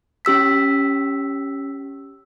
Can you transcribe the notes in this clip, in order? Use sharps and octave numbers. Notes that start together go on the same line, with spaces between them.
C#4 G4 E6 B6